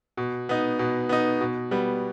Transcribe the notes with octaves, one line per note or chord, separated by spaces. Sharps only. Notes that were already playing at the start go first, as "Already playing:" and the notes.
B2
B3 D#4
B2
B3 D#4
B2
G3 B3